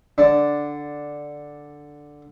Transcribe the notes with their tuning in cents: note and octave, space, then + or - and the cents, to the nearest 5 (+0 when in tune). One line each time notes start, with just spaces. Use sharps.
D3 +0 D4 +0 D5 +0